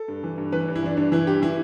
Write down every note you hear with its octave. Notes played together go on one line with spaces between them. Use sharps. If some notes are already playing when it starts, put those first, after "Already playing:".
Already playing: A4
G2
E3
G2
E3 B4
G2
E4
E3 D4
G2 D4
E3 E4
G2 G4
E3 E4